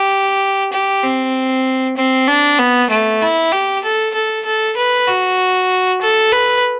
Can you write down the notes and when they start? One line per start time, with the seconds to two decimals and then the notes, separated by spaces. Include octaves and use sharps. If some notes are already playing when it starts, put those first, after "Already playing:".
Already playing: G4
0.73 G4
1.04 C4
1.97 C4
2.28 D4
2.59 B3
2.90 A3
3.21 E4
3.52 G4
3.84 A4
4.14 A4
4.46 A4
4.77 B4
5.08 F#4
6.02 A4
6.32 B4